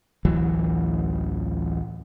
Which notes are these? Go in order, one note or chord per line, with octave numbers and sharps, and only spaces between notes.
A1 D2 E3 F#3